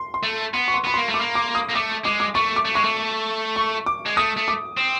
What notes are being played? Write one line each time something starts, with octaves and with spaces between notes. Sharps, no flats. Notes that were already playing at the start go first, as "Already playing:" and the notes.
Already playing: C6
C6
A3
B3 C6
C#6
C6
B3 B5
A#3 C6
A3
D6
A#3
D6
D#6
A#3
A3 D6
G#3 D6
D6
A3 C#6
D6
A3
G#3 C#6
A3
C#6
D6
G#3
A3 D#6
A3
D6
C4